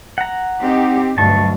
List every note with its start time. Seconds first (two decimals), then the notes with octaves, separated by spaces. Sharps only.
0.18 F#5 A#5
0.60 C4 D#4 G4
1.18 D2 G2 B2 F#3 A5 C#6